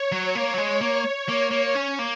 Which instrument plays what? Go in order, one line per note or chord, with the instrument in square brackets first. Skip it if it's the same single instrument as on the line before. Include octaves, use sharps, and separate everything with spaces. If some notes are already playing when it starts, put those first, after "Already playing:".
Already playing: [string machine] C#5
[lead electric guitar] F#3
A#3
F#3
G#3
A#3
A#3
A#3
C#4
A#3